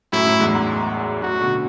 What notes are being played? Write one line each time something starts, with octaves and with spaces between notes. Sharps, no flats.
F#2 A2 E4
F#2 A2
E2 G#2
E2 G#2
F#2 A2 F#4
B2 D3